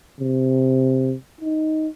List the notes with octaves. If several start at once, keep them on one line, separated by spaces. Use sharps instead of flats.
C3
D#4